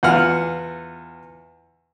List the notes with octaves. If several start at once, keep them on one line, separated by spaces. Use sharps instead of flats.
E2 F4 F#5 F6